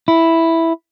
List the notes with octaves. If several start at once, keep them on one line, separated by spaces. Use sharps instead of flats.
E4